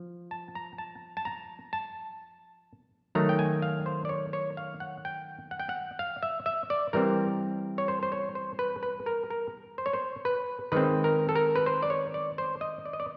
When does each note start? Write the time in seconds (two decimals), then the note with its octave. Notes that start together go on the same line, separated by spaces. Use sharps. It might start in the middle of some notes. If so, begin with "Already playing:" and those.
Already playing: F3
0.31 A5
0.55 A#5
0.78 A5
1.17 A5
1.25 A#5
1.73 A5
3.15 D#3 F#3 A3 A#5
3.29 G5
3.39 G#5
3.62 F5
3.86 C5
4.05 D5
4.09 C#5
4.33 C#5
4.57 F5
4.80 F#5
5.05 G5
5.51 F#5
5.60 G5
5.69 F#5
5.99 F5
6.23 E5
6.46 E5
6.70 D5
6.93 E3 G3 C4 A#4
7.78 C#5
7.88 C5
8.03 C5
8.12 C#5
8.35 C5
8.59 B4
8.83 B4
9.06 A#4
9.30 A#4
9.78 C5
9.86 C#5
9.93 C5
10.25 B4
10.72 D#3 G#3 C4 B4
11.04 A#4
11.29 A4
11.35 A#4
11.56 B4
11.66 C5
11.83 D5
11.90 C#5
12.14 D5
12.38 C5
12.61 D#5
12.85 D5
12.93 D#5
13.00 D5